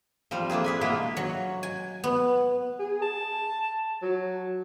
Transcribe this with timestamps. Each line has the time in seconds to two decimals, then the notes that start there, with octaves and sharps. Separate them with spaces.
0.31 F3 G3 C4
0.50 A3 A#3 D4 G#4
0.64 G#4 B4 G#5
0.81 B2 G#3 A#3 E4 F4
1.17 F#3
1.63 G#5
2.04 B3
2.79 G#4
3.02 A5
4.02 F#3